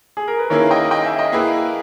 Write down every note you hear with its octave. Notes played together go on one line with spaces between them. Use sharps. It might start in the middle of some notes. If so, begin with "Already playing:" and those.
G#4
A#4
B4
D#3 A#3 C#4 E4 G#4 A#4 C#5
D#5 G5
D#5 G5
E5 G#5
D#5 G5
A#3 E4 G#4 B4